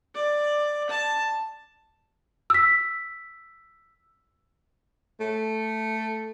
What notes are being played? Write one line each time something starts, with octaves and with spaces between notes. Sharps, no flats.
D5
A5
E6 B6
A3